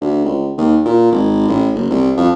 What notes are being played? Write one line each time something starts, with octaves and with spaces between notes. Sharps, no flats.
D2
C#2
D#2
A#2
G#1
A1
F#1
C2
F2